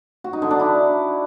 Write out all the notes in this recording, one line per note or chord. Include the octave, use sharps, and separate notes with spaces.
F#4
D#4
D3
D4
E4